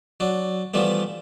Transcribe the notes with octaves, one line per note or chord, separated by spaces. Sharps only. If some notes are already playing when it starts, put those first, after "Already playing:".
F#3 D4
E3 F3 G3 A3 B3